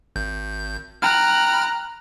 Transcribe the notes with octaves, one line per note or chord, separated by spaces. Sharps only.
G#1 G6
G5 A#5 B5 F6 F#6